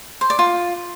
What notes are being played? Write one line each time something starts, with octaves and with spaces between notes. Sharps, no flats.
C5
D5
F4